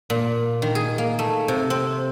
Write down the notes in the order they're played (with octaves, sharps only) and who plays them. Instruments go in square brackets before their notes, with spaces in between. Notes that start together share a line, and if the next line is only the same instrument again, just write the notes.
[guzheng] A#2
D#3
G#4
A#3
A3
C3
C4